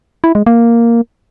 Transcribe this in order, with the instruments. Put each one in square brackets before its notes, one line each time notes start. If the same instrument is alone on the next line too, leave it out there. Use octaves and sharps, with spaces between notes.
[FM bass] E4
G#3
A#3